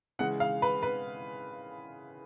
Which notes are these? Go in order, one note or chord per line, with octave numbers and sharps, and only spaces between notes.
C#3 E3 G#3 F#5
F5
B4
B4